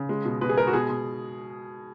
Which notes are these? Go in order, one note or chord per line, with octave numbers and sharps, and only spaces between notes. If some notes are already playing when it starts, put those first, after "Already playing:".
Already playing: C#3
G#3
B2
B2 B4
G#4
G#3 A#4
F#4
B2 G#4
B2